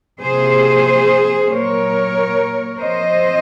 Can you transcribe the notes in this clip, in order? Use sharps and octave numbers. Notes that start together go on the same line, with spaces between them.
C3 F3 A#3 G#4 C5
A#2 F#3 A#3 A#4 C#5
F3 C4 C5 D#5